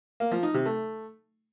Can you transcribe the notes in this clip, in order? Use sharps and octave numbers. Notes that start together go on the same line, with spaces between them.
A#3
F3
D#4
C3
A3